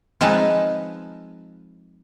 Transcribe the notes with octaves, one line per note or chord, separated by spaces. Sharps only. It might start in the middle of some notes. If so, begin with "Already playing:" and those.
F3 G#3 C4 D#4 B4 A5